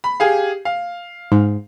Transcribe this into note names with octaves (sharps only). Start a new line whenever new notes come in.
B5
G4 G#4 F5
F5
G#2